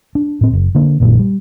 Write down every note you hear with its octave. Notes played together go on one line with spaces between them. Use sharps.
D4
A2 C4
F#1
D3 A#3
A#1 F#2 A#2 D#3
G3